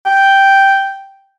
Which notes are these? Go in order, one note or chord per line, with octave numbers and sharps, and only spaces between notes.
G5